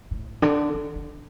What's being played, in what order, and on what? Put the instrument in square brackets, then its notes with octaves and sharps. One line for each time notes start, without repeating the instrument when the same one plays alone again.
[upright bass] A2
D3
D#3
D#3